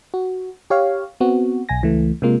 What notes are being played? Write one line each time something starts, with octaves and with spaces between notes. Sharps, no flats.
F#4
G4 C#5 F5
B3 C4 F#4
B1 G#5 A#6
C#2 E3 A3
C3 G#3 A#3 F4